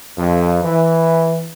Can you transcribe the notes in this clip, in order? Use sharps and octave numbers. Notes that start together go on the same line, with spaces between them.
F2
E3